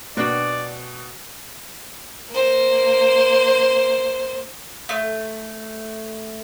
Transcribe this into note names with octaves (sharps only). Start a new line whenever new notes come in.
B2 A#3 D4 F#4 D5 G5
A#3 C5
A3